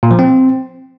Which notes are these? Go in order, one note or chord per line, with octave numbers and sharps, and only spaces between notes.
A#2
F3
C4